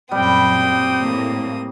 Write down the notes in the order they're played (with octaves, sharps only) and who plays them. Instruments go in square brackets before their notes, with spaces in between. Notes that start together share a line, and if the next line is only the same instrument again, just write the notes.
[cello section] F#2 A#2 [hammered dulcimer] G3 [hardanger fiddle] C4 D#6 [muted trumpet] G5
[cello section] A2 A#3